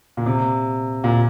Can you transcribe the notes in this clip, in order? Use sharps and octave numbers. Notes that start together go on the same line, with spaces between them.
A#2
C3
A#2